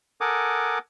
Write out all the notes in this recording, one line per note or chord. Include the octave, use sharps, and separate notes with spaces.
A4 A#4 F#5 G#5 D6 D#6